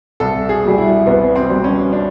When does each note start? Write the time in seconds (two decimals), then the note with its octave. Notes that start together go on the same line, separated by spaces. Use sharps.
0.20 C2 A4
0.49 G#4
0.64 B2 G3
0.78 E4
1.07 C2 B3
1.36 C4
1.50 B2 G3
1.64 C#4
1.93 D4